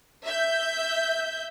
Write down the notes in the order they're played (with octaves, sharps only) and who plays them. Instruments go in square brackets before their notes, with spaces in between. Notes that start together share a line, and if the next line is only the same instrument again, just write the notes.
[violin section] E5 G6